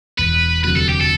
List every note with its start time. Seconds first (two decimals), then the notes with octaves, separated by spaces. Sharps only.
0.18 E1 B4
0.64 D2 C3 F#3 B4
0.76 A4
0.89 G4
1.00 A4